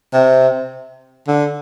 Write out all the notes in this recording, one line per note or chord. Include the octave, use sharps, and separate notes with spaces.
C3
D3